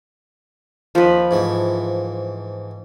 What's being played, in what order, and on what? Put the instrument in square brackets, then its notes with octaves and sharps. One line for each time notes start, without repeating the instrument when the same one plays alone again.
[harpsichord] D#2 [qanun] F3 B4
[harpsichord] G#2 E3 A3